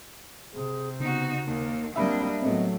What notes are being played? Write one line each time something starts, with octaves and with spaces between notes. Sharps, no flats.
C3 C4 G#4
C#3 B3 D#4 F#4
D#2 A#3
G3 A#3 C4 D4 D#5 E5 B5
A2 F#3 A3 B3 C4 D#5